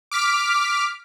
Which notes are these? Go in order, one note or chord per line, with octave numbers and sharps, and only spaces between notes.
D6 F6 B6